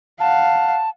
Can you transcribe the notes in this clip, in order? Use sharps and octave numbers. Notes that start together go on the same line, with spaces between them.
F5 F#5 A5